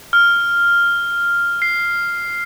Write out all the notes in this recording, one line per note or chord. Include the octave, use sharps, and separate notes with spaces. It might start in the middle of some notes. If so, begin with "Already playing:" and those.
F6
C7